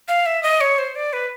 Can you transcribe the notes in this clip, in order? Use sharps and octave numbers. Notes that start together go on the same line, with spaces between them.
F5
E5
D#5
C#5
C5
D5
B4